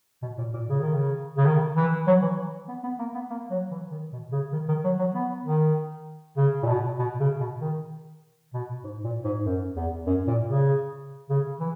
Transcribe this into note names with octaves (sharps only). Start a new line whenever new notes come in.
B2
A#2
A#2
C#3
D#3
C#3
C#3
D#3
E3
F#3
E3
B3
B3
A#3
B3
A#3
F#3
E3
D#3
B2
C#3
D#3
D#3
F#3
F#3
B3
D#3
C#3
A#2
B2
B2
C#3
B2
D#3
B2
G#2
A#2
G#2
F#2
E2
F#2
A#2
C#3
C#3
E3